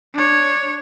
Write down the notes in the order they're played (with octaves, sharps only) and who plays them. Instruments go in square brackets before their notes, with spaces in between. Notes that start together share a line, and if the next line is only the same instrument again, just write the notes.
[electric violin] D4 C#5